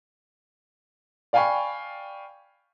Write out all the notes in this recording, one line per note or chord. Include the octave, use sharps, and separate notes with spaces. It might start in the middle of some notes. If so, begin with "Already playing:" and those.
D5 F5 G5 G#5 B5 C#6